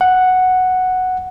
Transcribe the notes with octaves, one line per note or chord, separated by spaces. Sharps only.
F#5